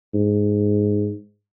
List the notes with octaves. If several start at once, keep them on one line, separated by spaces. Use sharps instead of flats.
G#2